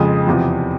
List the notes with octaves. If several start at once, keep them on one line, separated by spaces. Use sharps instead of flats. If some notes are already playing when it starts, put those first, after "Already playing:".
Already playing: F2 C#3 F3 G#3 D#6
E2 C3 F3